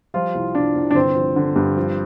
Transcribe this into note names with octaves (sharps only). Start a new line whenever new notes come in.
F3 G3 F4
C2
C2 D4
C2
D4
G1 C4
F3
D3
G2
F3